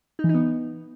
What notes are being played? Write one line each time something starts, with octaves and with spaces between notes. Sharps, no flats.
D#4
E3
D#4
B3